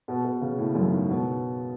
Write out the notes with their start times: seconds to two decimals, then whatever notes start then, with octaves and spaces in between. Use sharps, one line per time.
0.08 B2
0.25 B2
0.41 C#3
0.58 A2
0.75 F#2
0.92 G#2
1.09 B2